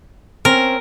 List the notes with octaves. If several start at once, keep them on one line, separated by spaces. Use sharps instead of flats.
C4 C#4 A#4